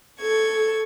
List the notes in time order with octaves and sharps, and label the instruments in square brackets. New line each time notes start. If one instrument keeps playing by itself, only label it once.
[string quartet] A4 C#6 G#6